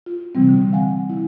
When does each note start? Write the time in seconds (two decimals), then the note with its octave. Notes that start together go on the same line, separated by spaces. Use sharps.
0.06 F4
0.35 C3 E3 G3 C4
0.49 D3
0.73 F5 F#5 G#5
1.10 E4